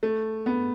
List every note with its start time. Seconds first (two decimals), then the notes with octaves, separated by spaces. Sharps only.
0.03 A3
0.46 B3